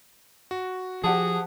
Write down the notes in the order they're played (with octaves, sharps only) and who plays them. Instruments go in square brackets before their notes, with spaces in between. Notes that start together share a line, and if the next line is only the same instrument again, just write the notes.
[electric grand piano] F#4
[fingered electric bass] F3 [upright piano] G4 F#5 A5 [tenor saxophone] G#4